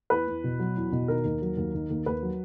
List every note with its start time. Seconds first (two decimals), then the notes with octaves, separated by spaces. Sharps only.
0.10 E2 B4
0.27 E2
0.44 B2
0.59 F#3
0.76 E2
0.92 B2
1.08 D#3 A#4
1.24 D#2
1.42 F#3
1.57 D#2
1.74 D#3
1.90 D#2
2.06 D#2 B4
2.23 F#3